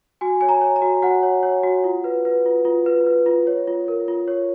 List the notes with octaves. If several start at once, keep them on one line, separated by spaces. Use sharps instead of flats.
F#4 G#5
C#5 G#5
A#5
C#5
A#5
F#4
F#4 F#5
C#5
C#5
F#4
F4
B4
B4
F4
F4
B4
B4
F4
C#5
F4
A#4
F4
C#5